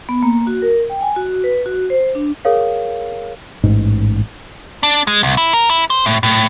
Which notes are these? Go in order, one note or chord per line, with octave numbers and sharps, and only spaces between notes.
B3
A#3
F#4
A#4
G5
G#5
F#4
B4
F#4
C5
D4
G#4 A#4 C#5 F5
A1 G#2
D4
G#3
C2
E4
A#4
E4
C5
A2
A2